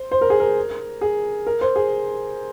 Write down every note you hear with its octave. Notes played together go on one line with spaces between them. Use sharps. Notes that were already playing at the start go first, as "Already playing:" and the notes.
Already playing: C5
C5
A#4
G#4
A#4
G#4
A#4
C5
G#4